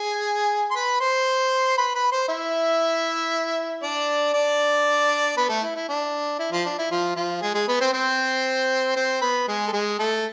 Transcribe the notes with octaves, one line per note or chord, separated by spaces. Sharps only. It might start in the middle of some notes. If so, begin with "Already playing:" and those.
Already playing: G#4 G#5
C6
B4 B5
C5 C6
B4 B5
B4 B5
C5 C6
E4 E5
D4 D5
D4 D5
B3 B4
A3 A4
E4
E4
D4
E4
F3 F4
D4
E4
F3 F4
F3 F4
G#3 G#4
G#3 G#4
B3 B4
C4 C5
C4 C5
C4 C5
B3 B4
G#3 G#4
A4
G#3 G#4
A3 A4